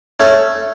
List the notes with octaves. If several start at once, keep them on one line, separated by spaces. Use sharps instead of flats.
A3 C#4